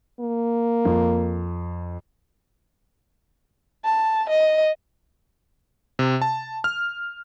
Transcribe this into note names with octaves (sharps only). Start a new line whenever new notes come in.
A#3
F2
A5
D#5
C3
A5
F6